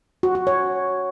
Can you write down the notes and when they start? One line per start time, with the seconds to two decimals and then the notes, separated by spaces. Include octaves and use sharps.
0.23 F#4
0.35 F#4
0.47 C#5